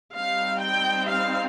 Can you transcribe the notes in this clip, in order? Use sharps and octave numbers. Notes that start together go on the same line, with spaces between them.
G3 C4 D#4 F5
G5
F5